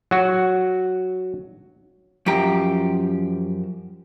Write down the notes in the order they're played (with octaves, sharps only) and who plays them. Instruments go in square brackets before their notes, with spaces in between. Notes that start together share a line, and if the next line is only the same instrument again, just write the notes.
[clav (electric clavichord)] F#3 F#4
[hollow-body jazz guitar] F#2 F3 G4 A#5